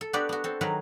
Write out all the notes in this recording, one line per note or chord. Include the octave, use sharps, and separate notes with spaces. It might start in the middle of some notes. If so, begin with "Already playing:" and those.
A4
B3 D4 F#4 G4 B4 D5
B3 F#4
C4 A4
D#3 F#3 G#4 A#4 B4